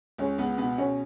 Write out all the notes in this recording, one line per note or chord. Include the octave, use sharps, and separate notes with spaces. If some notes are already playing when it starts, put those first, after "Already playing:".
C#2 C#4
C#2 B3
B2 B3
B2 C#4